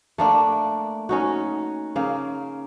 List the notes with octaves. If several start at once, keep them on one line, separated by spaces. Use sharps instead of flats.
A3 A#3 D4
C#4 D#4 F#4
C#3 A#3